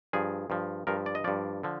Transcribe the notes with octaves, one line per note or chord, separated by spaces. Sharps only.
G2 F3 G#4
G2 F3
G2 F3 A#4
D5
D#5
G2 F3 D5
D3 F3